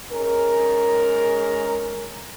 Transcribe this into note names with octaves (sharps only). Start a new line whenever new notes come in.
G#2 G#3 C#4 A#4